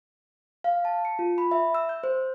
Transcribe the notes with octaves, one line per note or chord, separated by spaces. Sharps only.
F5
A5
C#7
F4
B5
E5
E6
G6
C5